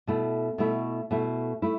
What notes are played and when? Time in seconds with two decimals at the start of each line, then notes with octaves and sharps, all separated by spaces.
0.07 B2 A3 E4
0.58 B2 A3 E4
1.11 B2 A3 E4
1.62 A3 E4